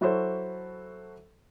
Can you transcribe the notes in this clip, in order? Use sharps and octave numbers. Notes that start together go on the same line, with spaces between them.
F#3 E4 F#4 A4 C5